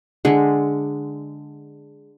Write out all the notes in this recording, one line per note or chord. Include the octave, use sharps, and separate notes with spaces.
D3 G#3